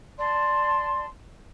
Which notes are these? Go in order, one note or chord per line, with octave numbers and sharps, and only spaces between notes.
D5 A5 C6